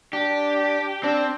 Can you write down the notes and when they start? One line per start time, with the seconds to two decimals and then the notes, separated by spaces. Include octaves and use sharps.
0.13 D4 G4
1.03 C4 D4